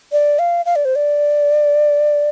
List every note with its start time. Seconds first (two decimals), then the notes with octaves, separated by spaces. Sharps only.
0.12 D5
0.39 F5
0.66 F5
0.76 D5
0.85 C5
0.96 D5